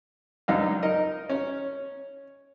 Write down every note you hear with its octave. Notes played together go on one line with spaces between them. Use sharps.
C#2 F#2 D4 D#4 F5
D#4 A#4 D#5
C#4 C#5